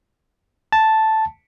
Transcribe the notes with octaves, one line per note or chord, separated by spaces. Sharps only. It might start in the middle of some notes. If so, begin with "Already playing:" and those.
A5